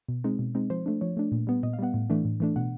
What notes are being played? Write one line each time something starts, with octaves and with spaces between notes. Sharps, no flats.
B2
G#3 C4 D#4
B2
G#3 C4 D#4
F3 C5
A3 D4
F3 C#5
A3 D4
A#2
G3 B3
A#2 D#5
F5
G3 B3 F#5
A2
E3 A3 D4
A2
E3 A3 D4
B2 F#5